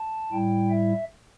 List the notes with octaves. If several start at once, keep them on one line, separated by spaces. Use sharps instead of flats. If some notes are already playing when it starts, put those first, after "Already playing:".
Already playing: A5
A2 G3 E4 G5
E5